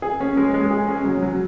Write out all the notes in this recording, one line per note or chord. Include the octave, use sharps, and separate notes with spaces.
G#4
C#4
G#3
G#3
G#4
C#4
F#3
F#3